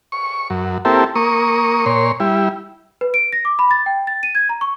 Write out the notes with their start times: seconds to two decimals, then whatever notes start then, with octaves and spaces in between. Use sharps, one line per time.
0.12 C#6
0.50 F#2
0.85 A#3 C4 E4 G4 A4
1.15 A#3 C#6 D#6
1.86 A#2 C#5 C6
2.20 G3 E4
3.01 B4
3.14 D7
3.33 A#6
3.45 D6
3.59 B5
3.71 A6
3.86 G5
4.07 A6
4.23 D#7
4.35 G#6
4.49 A#5
4.61 C#6